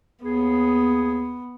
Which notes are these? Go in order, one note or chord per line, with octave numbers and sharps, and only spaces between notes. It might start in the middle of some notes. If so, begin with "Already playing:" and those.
D#2 B3 G#4